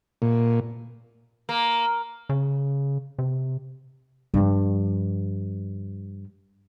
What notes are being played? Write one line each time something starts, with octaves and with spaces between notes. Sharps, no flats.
A#2
A#3
C#3
C3
G2 F3